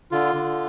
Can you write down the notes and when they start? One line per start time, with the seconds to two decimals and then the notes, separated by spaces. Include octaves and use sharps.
0.12 D3 F4
0.35 D3